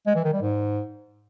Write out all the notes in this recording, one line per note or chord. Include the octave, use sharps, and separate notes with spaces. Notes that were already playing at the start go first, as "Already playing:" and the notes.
G#3
E3
D#3
G3
G#2